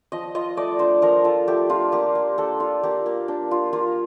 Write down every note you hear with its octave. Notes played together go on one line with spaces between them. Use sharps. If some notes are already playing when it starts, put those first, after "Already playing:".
F3 D#5
F4 D#5
A3 D5
D4 C5
F3 A#4
F4 A4
A3 G4
D4 F4
A#3 G4
A#3
D4 A4
F4
A#3 G4
A#3
D4
F4
A#3 F4